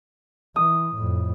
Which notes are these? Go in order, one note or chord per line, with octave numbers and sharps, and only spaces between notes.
E3 D#6
F2 A2